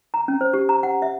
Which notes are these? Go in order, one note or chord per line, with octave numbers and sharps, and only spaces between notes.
A#5
C#4
C5
G4
A#5
F#5
E5